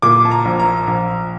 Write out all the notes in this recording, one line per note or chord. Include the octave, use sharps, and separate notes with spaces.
A#2 D6
A5
A#5
A#1
A#5
A#1